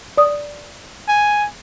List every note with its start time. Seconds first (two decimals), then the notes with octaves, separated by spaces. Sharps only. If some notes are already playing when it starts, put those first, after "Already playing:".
0.17 D5 D#6
1.08 G#5